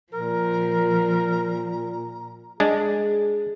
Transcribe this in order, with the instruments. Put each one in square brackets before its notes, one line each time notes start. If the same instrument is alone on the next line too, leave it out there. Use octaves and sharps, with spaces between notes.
[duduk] A#2 [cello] F3 [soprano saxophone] A#4 [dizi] A#5
[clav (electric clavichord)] G#3 D4 [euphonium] G#4